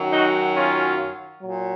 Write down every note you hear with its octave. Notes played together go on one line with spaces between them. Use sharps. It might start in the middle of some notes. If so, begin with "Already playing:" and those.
Already playing: F#2 D#3 F#3
D#4 F#4
C#4 F4
A#2 F#3